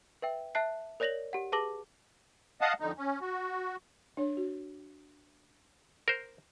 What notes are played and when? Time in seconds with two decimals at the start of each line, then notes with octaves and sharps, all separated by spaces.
0.22 B4 E5 G5
0.55 E5 A5 F#6 C7
1.00 A#4 C#5 D5 A#6 F7 F#7
1.33 G4 F#5
1.52 G#4 B4 A5 D6 A#6 F#7
2.61 D#5 F5 F#5 A5 D#6
2.80 F2 D3 D#4
2.98 C#4
3.21 F#4
4.17 D4 C#5
4.37 F#4
6.08 A#4 C5